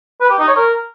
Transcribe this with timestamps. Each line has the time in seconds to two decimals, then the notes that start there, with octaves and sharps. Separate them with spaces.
0.21 B4
0.30 G4
0.39 D#4
0.48 C#5
0.57 A#4